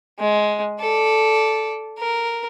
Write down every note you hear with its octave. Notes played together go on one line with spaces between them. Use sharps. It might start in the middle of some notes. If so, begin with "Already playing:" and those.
G#3
A4 D5
A#4